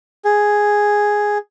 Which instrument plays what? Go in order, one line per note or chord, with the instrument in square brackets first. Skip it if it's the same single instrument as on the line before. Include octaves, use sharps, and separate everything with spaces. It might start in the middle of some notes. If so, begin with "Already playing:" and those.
[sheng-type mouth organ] G#4